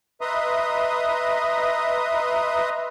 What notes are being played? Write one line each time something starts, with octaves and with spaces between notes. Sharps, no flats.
B4 D#5 E5 A#5 C6 D#6